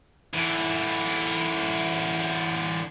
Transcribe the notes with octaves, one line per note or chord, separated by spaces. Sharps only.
D3 E3